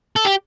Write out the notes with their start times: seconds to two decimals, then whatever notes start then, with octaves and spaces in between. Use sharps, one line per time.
0.16 A4
0.25 G4